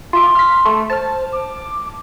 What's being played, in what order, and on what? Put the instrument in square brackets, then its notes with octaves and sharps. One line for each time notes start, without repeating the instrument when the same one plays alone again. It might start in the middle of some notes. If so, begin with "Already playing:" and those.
[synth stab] F4 E5 D6 [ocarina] C6
[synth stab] F6 B6
A3
[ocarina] C5 [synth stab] A5 F6
[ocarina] D6